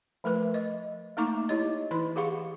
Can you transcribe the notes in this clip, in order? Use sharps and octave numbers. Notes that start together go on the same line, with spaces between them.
F3 A3 A#4 B4
D#5
A3 A#3 D#4 A#5 C#6 D6
E4 G4 C#5 D#5
E3 E4 B5 C6
G4 G#4 F5 F#5 C#6